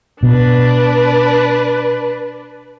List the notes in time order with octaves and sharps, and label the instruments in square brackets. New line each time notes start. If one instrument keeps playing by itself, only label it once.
[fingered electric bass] B2 [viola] D4 B4